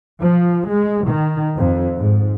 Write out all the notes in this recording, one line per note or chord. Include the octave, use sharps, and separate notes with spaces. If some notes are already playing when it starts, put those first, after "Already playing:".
F3
G#3
D#3
F2
G#2